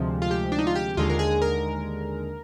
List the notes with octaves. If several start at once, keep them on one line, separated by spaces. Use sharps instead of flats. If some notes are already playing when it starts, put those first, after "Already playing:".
Already playing: D2 C3 F3 G#3
F4
G4
D4
D#4
F4
G4
D#2 D3 G#3 F4
A#4
G#4
A#4